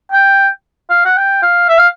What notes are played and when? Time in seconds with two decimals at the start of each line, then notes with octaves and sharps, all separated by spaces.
0.12 G5
0.90 F5
1.05 F#5
1.17 G5
1.42 F5
1.69 E5
1.79 F5